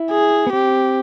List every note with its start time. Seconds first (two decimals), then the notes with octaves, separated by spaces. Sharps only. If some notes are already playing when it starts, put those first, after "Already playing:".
Already playing: E4
0.11 G#4
0.47 B3
0.52 C4 G4